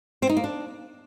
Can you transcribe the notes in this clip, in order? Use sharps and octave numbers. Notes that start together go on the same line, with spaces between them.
C4
D#4
A#3
D4